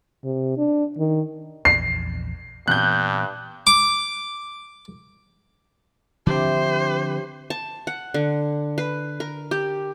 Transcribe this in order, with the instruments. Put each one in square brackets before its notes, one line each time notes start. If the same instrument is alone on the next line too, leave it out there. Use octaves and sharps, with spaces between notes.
[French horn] C3
D4
D#3
[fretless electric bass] A#1 E2 [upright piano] C7
[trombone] G2 [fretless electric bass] A#2 E3 B3 [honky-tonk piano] F#6 G6
[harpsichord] D6
[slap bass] D3 F3 C4 [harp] D4 E4 [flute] G4 [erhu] C5
[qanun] A5
F#5
D3
B4
A#4
G4